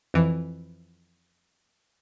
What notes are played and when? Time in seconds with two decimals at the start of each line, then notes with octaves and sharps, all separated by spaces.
0.14 F2 E3